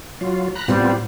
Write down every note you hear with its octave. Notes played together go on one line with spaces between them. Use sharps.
F#3 F4
A#5 B5 F#6
A2 G3 B3 C4 F4